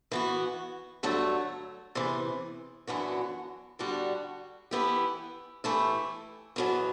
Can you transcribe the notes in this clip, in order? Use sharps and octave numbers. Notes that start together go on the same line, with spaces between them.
E3 B3 F#4
G2 D3 F#3 A3
E2 C3 E3
F#2 E3 B3 D4 F#4
D3 G3 D4 F#4
E3 B3 E4 G4
E3 A3 E4 G4
E2 B2 F#3